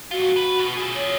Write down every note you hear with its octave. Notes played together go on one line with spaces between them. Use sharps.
G2 F4 F#4
D2 B4
B2
F4 G#4
C#5